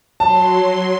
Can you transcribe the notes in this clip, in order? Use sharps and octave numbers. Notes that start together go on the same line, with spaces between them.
F#3 A5 C6